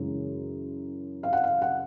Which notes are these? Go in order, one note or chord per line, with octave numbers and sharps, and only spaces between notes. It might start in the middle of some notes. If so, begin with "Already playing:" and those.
Already playing: F#2 C#3 E3 G#3
F5
F#5
F5
F#5